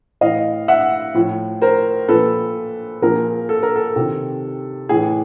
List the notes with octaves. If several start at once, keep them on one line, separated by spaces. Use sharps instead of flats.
A2 E3 D#5 F5
E5 F#5
A2 F3
A#4 C5
A#2 F3 A4 B4
A#2 F3 G#4 A#4
A4
A#4
A4
C3 D#3
A2 E3 G#4